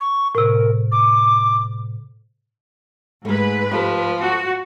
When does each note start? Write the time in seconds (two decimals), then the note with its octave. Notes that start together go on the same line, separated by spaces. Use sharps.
0.01 C#6
0.35 A2 C3 A#4
0.92 D6
3.25 G#2 G#3 A3 B4
3.72 F3 G4 A4 C5
4.21 F#4